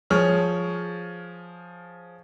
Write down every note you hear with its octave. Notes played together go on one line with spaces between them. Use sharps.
F3 G#4 C#5 F6